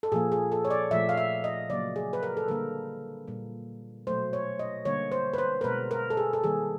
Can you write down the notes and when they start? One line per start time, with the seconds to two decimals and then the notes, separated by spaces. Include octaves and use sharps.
0.03 A4
0.12 A#2 F3 A#3 G#4
0.32 G#4
0.52 A4
0.65 C#5
0.71 D5
0.91 A#2 F3 A3 E5
1.09 F5
1.17 E5
1.44 D#5
1.70 C#3 F#3 A#3 D5
1.96 G#4
2.13 B4
2.23 A#4
2.37 A4
2.48 D3 G3 A#3 A#4
3.27 A#2 G3 A#3
4.07 B2 F#3 A3 C5
4.33 C#5
4.59 D#5
4.85 D3 G3 A#3 C#5
5.12 C5
5.34 B4
5.38 C5
5.61 A#4
5.64 B2 G#3 B4
5.91 A#4
6.10 A4
6.17 G#4
6.33 A4
6.44 D#3 G3 A#3 G#4